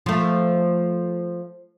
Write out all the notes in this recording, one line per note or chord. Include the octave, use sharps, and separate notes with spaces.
F3 A3